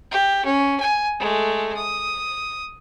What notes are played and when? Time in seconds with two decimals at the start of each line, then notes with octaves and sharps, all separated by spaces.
0.11 G4
0.45 C#4
0.80 G#5
1.19 G#3 A3
1.77 D#6